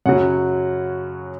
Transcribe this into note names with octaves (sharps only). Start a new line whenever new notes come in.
F#2 C#3 F#3 F#5